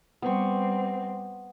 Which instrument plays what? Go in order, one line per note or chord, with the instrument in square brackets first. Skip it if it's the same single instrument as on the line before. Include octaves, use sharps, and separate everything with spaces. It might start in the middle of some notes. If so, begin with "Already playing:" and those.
[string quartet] G3 C4 [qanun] B3 C#6